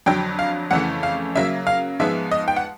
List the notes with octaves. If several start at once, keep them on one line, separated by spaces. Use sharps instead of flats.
F2 D3 F#3 G5
F5
F2 C#3 E3 A3 F#5
F5
C#3 F#3 A#3 E5
F5
G#2 F3 G#3 B3 E5
D#5
G5
F#5